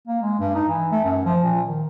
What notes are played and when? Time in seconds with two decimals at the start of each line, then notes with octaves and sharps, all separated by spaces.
0.08 A#3
0.22 G#3
0.40 G2
0.55 D#4
0.69 E3
0.91 A3
1.05 F#2
1.25 F3
1.44 A#2
1.67 D#3